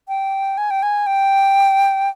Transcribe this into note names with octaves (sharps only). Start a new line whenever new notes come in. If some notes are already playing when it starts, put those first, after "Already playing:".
G5
G#5
G5
G#5
G5